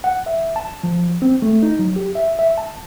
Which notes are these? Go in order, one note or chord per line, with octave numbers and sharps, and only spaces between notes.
F#5
E5
A5
F3
C4
A3
D#4
F#3
G4
E5
E5
A5